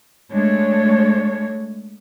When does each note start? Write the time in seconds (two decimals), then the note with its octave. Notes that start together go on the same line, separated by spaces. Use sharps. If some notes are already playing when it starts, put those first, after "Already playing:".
0.33 G#3 A3 D4 C#5